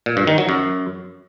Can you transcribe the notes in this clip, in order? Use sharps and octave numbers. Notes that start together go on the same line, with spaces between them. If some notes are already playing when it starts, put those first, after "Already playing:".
A#2
G2
D#3
F#3
F#2